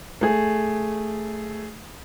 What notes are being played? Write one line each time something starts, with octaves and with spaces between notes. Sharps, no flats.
A3 G#4